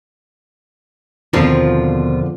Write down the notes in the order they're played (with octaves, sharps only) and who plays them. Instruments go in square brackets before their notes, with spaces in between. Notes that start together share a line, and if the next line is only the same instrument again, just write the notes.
[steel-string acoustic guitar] D#2 B2 F4 [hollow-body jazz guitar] D3 F3 C4